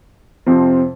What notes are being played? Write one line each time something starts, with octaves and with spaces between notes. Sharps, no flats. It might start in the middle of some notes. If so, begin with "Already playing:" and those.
F2 C3 F3 C4